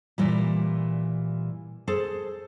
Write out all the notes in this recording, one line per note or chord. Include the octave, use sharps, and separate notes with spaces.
A#2 E3 G3
G#4 A4 C5